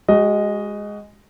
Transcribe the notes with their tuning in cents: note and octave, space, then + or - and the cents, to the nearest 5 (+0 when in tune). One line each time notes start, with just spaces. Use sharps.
G#3 -5 F#4 +30 D#5 +0